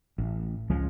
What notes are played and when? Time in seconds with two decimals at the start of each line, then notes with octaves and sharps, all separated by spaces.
0.18 A1
0.70 C#2 F3 G#3 C#4